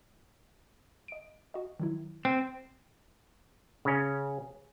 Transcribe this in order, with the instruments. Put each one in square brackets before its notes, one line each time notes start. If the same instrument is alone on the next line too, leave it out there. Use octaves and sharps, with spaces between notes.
[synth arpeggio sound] D#5 D7
F#4 D#5
D#3 F#3 E4
[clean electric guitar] C4
[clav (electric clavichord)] C#3 C#4